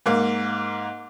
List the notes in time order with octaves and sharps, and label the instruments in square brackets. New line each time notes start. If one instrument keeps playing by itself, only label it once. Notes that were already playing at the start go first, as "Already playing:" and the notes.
[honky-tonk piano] G#2 A#3